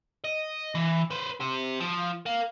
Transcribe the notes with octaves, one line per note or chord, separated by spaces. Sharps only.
D#5
E3
B4 C5
G4 C5
F3
A#4 F5